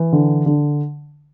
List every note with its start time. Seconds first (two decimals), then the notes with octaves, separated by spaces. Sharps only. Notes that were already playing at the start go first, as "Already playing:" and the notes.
Already playing: E3
0.13 D3
0.46 D3